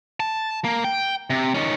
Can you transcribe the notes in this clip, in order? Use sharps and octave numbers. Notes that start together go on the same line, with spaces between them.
A5
A#3
G5
C3
D#3 C#4